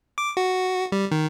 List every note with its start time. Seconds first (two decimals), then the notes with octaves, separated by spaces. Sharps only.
0.18 D6
0.37 F#4
0.92 G3
1.11 D#3